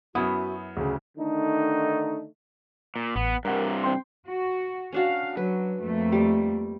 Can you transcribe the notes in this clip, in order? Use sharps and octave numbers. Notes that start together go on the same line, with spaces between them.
F#2 B3 E4 F#4 D#6
D2 C#3 G#4
D3 D#3 A3 D4 D#4
A#2
A1 B3
G2 C3 A#4 F#5
C4 G5 C6
F#4
C#4 D4 F#4 F5
F#3 B4
F2 A3 A#3
G3